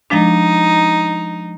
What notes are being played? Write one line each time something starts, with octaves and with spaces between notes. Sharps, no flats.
F3 G#3 D4 D#4